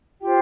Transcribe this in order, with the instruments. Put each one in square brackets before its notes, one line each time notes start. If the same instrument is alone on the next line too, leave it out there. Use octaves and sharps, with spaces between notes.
[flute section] F4 G4 C5 G5